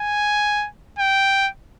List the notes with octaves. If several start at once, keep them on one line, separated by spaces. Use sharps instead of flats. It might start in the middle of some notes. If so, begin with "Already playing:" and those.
Already playing: G#5
G5